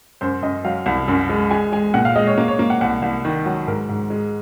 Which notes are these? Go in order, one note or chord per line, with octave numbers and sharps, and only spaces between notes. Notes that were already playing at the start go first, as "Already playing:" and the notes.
F#2 C5
F#2 D#5
F#3 F5
C2
F#2
G#3
G#3 G#5
G#3 G#5
A#2 F#5
F5
G#3 D#5
C#5
A#3
C#5
A#3
F#5
C2 F#5
C2
D#3
F#3
G#2 A#4
G#2
G#3